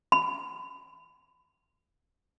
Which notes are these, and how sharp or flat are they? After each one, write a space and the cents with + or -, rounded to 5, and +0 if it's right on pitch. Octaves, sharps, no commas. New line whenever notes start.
B5 +30